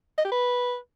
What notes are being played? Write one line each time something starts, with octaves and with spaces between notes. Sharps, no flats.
D#5
G4
B4